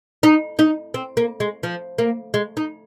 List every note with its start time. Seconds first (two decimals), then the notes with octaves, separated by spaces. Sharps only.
0.23 D#4
0.59 D#4
0.94 C4
1.17 A#3
1.40 G#3
1.63 F3
1.98 A#3
2.34 G#3
2.57 D#4